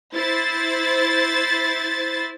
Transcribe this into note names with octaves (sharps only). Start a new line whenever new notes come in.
E4 C5 A6